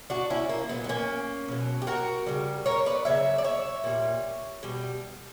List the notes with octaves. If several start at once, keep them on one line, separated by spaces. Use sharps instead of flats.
D4 F#4
C#4 E4
A#3
A#2 F#3 B3
B3
A#3 C#4
B2 F#3
G4
F#4 A#4
C#3 G3
A#4 C#5
B4 D5
C#3 F#3 C#5 E5
D5
C#5 E5
A#2 G3
B2 G3